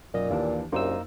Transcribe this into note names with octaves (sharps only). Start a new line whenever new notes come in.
B1 F#2 A#2 D#5
D#2 E3 D4
C2 F#2 A#3 D#4 C5 C6 E6